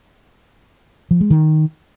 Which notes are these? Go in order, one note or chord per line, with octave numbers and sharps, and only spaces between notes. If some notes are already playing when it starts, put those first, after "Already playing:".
F3
G#3
D#3